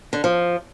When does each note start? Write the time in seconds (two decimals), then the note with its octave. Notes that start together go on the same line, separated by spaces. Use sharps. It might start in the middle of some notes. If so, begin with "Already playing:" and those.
0.13 D3
0.24 F3